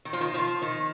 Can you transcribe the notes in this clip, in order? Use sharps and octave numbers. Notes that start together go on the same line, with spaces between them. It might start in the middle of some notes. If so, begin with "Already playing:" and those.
D#3
F3
D#3
F3
D#3